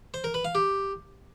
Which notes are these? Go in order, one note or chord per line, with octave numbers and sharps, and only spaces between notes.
C5
A#4
B4
F5
G4